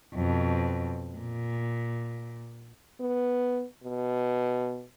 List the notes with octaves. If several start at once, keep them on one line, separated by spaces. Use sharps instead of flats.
F2 B2
A#2
B3
B2